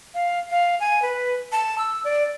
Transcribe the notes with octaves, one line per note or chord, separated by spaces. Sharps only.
F5
F5
G#5
B4
A5
E6
D5